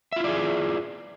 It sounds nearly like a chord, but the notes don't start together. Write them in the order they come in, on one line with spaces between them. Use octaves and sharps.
E5 F4 E4 D5 G#4